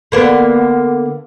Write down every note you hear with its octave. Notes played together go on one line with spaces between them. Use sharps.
D3 A#3 B3